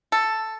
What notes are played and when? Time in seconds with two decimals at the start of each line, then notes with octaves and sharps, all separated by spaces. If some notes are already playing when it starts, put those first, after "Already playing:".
0.12 A4